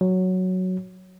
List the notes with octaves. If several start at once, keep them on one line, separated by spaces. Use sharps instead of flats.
F#3